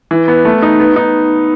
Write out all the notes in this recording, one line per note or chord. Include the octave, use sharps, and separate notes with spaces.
E3
B3
A3
D#4
B3
D#4